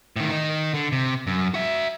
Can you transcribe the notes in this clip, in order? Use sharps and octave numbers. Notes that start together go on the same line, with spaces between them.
A2 D#3
D#3 D#4
D3
C3
F#2
F#4 E5